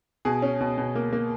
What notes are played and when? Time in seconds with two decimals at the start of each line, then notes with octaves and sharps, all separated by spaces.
0.25 B2 G#4
0.42 C#4
0.61 B2
0.78 B2
0.95 A#3
1.13 A#3